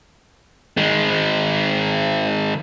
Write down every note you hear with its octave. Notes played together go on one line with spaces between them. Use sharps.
D#3 G#3